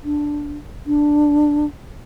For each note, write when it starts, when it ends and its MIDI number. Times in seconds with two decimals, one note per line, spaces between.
0.04 0.57 62
0.87 1.66 62